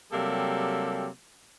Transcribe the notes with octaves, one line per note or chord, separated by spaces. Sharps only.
C3 F#3 G3 A#3 G4 A4